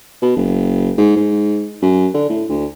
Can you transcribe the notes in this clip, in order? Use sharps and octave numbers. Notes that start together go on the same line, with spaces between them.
B2
F#1
G#2
G#2
F#2
D3
A2
D2